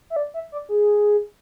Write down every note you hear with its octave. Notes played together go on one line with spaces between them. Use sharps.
E5
D5
E5
D5
G#4